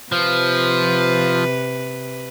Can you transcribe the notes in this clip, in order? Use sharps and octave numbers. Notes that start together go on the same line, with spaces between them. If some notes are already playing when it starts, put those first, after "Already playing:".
C3 F3 B4